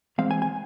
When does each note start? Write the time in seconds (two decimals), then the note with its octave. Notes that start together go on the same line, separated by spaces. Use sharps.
0.18 E3 G#3 C4 F5
0.31 G#5
0.42 G#5